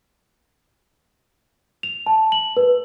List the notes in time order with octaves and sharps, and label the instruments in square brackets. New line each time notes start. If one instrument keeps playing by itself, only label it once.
[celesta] F7
A5
F#7
B4